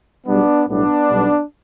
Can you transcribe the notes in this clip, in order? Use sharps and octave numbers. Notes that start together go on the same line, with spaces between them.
B1 B2 G3 B3 D4
B1 A2 G3 B3 D4
B1 B2 G3